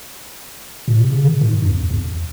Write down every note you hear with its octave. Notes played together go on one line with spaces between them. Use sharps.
A2
C3
C#3
D#3
A2
G#2
F#2
E2
E2